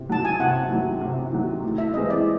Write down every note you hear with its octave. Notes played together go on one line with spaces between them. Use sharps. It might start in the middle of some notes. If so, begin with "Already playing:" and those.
Already playing: C3
D#3 F#3 A5
G#5
C3 F#5
D#3 F#3
C3
D#3 F#3
A2
E5
E3 G#3 C4 E4 D#5
D5